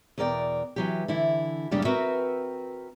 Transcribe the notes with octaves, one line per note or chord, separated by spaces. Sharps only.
E2 B2 A#4 D5 G5
E3 F#3 G4
D3 E3 E4
F#2 C#3 G3 A#3 D4 G4
C4 F#4 A#4 B4 E5